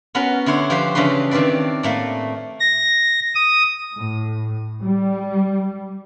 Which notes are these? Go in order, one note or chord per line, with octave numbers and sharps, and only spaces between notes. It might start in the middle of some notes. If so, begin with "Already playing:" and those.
B3 C#4 F#4 A#4 B4 F#5
D3 E4 C5 C#5
F3 G4 B4 C5
C#3 E3 D4 B4 C6
D#3 C4 D4 B4 D5
A2 A3 A#3
A#6
D#6
A2
G3